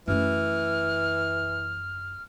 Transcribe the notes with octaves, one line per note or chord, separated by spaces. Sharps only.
F#2 E3 A3 F6